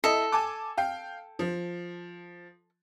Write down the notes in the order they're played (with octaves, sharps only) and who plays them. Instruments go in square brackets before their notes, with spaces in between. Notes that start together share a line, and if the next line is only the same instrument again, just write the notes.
[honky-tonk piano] E4 D#5 [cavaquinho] A4
[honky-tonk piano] G#5 A5 D6
F5 G5
F3